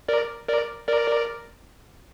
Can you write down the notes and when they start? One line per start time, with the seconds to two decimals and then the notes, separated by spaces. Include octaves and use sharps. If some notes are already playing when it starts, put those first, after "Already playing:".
0.08 A#4 D5
0.48 A#4 D5
0.88 A#4 D5